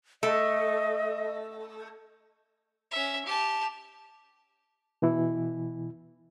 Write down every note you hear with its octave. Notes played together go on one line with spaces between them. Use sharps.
A3 D#5
C#4 E5
G4 A5
B2 E3 E4